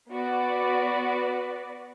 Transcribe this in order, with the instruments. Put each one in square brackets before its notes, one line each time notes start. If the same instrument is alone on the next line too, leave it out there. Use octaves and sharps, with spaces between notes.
[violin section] B3 F#4 B4 D5